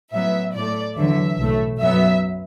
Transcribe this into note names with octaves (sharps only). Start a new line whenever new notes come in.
A2 F#3 B3 E5
A2 A3 D5
E2 D3 F#3 E5
B1 A2 A3
F#2 F#3 B3 E5